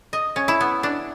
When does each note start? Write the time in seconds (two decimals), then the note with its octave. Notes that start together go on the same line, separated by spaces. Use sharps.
0.13 D#5
0.36 C#4
0.48 E4
0.61 B3
0.83 D4